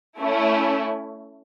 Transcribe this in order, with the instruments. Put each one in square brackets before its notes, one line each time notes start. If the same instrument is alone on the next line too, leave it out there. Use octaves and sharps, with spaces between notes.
[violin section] A3 C#4 E4